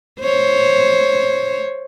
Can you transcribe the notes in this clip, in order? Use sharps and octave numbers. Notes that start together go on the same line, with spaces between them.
C5 C#5